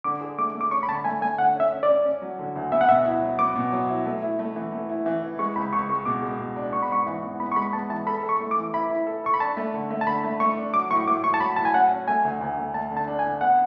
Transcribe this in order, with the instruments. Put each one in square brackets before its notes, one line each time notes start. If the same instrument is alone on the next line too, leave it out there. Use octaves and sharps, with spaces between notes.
[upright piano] D3 [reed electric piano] D6
[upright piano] G#4
[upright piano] A3 [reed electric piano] D6
[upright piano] A3
[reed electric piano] D6
[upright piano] C#4 [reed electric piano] C#6
[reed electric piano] B5
[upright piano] D3 [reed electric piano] A5
[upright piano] A3 [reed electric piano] G#5
[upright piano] A3 [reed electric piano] G#5
[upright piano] D3 [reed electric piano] F#5
[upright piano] C#4
[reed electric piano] E5
[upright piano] C#4
[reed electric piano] D5
[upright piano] C#4
C#4
F#3
D3
D2
[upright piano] B3 [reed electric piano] E5
[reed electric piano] F#5
[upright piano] B2 [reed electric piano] E5
[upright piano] E4
F#3
[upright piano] B3 [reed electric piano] D6
[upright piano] B2
F#3
E4
A3
E4
A3
E3
A3
E4
E3
E4
[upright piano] G#3 [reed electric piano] C#6
[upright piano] C#2 [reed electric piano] B5
[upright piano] C#2 [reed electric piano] C#6
[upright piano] G#3 [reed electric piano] C#6
[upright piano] B2 [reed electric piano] D6
[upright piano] G#3
B2
D4
[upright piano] B3 [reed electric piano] C#6
[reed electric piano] B5
[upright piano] G#2 [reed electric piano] C#6
[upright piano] E3
B3
[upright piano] B3 [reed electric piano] B5
[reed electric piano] C#6
[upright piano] G#3 [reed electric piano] B5
[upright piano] B3 [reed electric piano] A5
[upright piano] E3 [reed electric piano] A5
[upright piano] A4 [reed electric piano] B5
[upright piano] A4
[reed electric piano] C#6
[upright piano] A3
[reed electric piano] D6
[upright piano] E3
[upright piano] E4 [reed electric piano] B5
[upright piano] E4
A4
[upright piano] A4 [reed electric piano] C#6
[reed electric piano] B5
[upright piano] D4 [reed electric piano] A5
[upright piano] A3
D3
A3
[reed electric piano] A5
[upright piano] D3 [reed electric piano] B5
[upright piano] A3
[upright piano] A3 [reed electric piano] C#6
[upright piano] D4
[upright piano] F#3 [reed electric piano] D6
[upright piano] A2 [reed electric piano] C#6
[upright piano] A2 [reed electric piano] D6
[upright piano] A2 [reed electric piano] C#6
[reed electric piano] A5
[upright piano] F#3 [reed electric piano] B5
[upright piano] A2 [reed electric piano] A5
[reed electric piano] G#5
[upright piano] C#4 [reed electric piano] F#5
[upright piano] C#4
[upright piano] A3 [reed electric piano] G#5
[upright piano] D2
D2
A3
[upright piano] A3 [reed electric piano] A5
[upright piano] D3
[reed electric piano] A5
[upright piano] D4
[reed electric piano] G#5
[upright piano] D3
[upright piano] B3 [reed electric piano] F#5